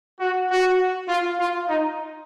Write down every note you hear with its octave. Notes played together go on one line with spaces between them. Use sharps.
F#4
F#4
F4
F4
D#4